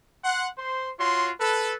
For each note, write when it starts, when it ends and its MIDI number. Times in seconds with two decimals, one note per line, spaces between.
0.24 0.47 78
0.24 0.47 84
0.58 0.91 72
0.58 0.91 84
0.99 1.30 65
0.99 1.30 66
0.99 1.30 73
0.99 1.30 84
1.41 1.75 69
1.41 1.75 71